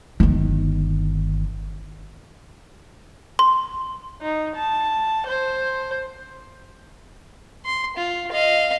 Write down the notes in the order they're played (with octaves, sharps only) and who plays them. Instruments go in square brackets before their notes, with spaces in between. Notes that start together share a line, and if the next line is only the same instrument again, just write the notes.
[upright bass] G1 D#3
[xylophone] C6
[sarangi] D#4
A5
C5
[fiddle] C6
F4
D#5 F5